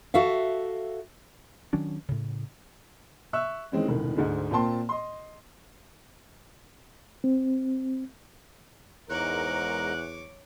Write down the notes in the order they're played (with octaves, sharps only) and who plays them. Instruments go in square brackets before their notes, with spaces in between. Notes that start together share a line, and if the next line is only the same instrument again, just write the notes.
[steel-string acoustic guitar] F#4 A4 E5 F5
[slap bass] D#3 F#3 C#4 D4
A2 C#3
[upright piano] E5 C#6 E6 F#6
D#3 E3 G#3 C4 C#4
E1 C2 A2 D#3
D2 G#2 G#3
A#2 A#3 C4 G5 A5 C6
D#5 C6
[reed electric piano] C4
[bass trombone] E2 [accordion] G#2 A#4 [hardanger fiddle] C#5 D6 [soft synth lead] F#6